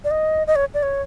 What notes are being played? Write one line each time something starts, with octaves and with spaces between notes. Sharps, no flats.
D5
D#5
D#5
C#5
D5
C#5